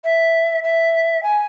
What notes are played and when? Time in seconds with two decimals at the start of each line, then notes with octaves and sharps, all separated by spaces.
0.04 E5
0.63 E5
1.23 G#5